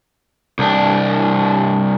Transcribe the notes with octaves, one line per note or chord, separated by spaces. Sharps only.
C2 D4